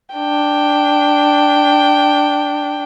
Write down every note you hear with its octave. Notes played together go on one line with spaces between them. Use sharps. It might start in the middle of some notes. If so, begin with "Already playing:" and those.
D4 G5